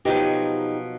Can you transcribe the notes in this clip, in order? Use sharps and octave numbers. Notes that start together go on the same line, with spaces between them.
B2 F3 F#3 D#4 G4